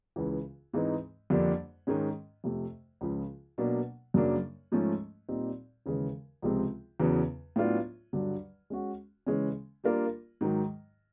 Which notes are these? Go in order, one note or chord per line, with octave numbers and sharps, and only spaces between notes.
C#2 C#3 E3
G#2 E3 G#3 C4 D#4
F2 D3 G3 A#3 D4
G#2 D#3 G#3 C#4
F2 C3 F3 A3
C#2 C#3 F3
B2 F#3 A#3 D4
F#2 C#3 F#3 A#3 D4
G#2 F3 A3 C#4
A#2 G3 C4 D#4
D#2 C#3 E3 G#3
C#2 C3 F3 G#3 C4
E2 C#3 F#3 B3
A2 F#3 B3 D4 F4
G2 D3 F#3
G#3 C#4 F#4
C#3 E3 G#3 C#4
G3 A#3 D4 F4 A#4
G#2 D#3 F#3